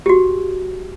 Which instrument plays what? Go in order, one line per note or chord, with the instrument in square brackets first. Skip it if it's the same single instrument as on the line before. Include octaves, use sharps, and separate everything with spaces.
[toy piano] F#4 G4